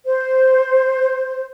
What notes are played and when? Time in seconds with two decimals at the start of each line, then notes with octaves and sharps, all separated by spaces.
0.05 C5